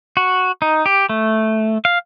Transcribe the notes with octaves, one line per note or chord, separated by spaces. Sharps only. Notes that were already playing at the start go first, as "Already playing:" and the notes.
F#4
D#4
G4
A3
F5